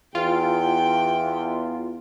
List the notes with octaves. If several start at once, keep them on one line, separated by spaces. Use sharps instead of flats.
E2 F4 G5